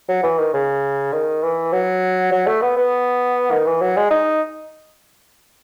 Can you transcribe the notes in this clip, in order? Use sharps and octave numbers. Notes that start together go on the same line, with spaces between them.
F#3
E3
D#3
C#3
D#3
E3
F#3
F#3
A3
B3
B3
D#3
E3
F#3
G#3
D#4